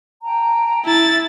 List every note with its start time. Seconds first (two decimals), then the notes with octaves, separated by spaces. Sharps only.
0.24 G5 A5 A#5
0.85 E4 A6